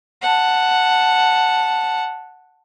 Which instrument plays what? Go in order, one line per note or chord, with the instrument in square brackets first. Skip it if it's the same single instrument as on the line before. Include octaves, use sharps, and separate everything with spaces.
[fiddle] F#5 A5